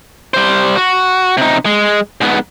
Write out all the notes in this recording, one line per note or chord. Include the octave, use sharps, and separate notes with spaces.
G3 C5
F#4
C3 D#4
G#3
G#2 B3